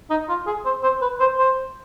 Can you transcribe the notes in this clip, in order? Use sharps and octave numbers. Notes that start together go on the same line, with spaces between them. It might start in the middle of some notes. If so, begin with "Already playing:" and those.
D#4
F4
G#4
C5
C5
B4
C5
C5